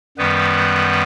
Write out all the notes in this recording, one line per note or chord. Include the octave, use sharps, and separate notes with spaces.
F#2 D#3 G3 B3 B4